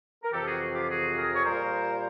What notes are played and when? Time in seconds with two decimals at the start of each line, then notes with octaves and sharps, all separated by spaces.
0.23 A#4
0.32 F2 C3 E3 G4 A4
0.46 F#4 G#4
0.75 F4 G4
0.89 F#4 G#4
1.17 G#4 A#4
1.35 C#5
1.45 A#2 G3 A#4 C5